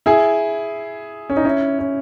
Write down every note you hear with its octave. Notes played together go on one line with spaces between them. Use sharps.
E4 G#4
C#4
D#4
C#4 E4
C#4